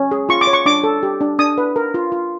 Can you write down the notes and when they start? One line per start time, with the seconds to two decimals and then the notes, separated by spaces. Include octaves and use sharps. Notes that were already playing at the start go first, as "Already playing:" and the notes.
Already playing: C#4
0.11 G#4
0.29 F4 C#6
0.41 D6
0.47 C#5
0.53 C#6
0.66 D4 D6
0.84 A4
1.03 G4
1.21 D4
1.39 D4 D#6
1.58 B4
1.76 A#4
1.94 F4
2.12 F4